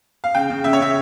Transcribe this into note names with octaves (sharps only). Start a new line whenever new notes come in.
F5
C#3 G5
C#3
C#3 E5
C#5
C#3 E5